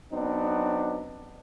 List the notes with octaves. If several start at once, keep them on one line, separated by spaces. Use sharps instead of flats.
F#3 B3 C4 D4 D#4